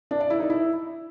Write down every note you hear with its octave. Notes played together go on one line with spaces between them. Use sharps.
D4
D5
E4
D#4
E4